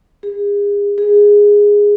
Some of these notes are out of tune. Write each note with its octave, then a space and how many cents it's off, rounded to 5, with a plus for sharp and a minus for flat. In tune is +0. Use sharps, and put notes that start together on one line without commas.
G#4 -35
G#4 -10